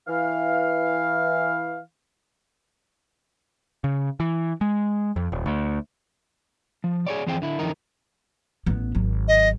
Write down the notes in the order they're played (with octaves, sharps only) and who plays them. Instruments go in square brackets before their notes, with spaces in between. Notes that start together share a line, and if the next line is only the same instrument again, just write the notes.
[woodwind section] E3 F5
[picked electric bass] C#3
E3
G#3
F2
D#1
D2
[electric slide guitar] F3
G#4 C#5 D5
F2 E3 C4 G#4 C5 G5
D3 E4
F2 D3 E3 D#4 A#4
[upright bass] A1 B3
G#1 F#3
[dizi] D#5